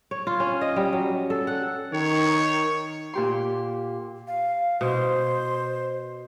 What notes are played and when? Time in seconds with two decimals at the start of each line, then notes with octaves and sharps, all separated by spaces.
0.11 C#5
0.27 F4
0.40 C#4
0.61 D#5
0.76 G3
0.93 F#3
1.30 A4
1.47 F#5
1.93 D#3 C#5
3.14 A#2 G4 C6
4.27 F5
4.81 B2 C5